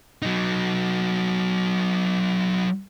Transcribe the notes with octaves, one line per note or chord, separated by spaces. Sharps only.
F#3 D#4